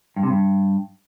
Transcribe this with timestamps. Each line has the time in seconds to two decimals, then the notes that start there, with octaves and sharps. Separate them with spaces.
0.16 G2
0.23 C3
0.30 G2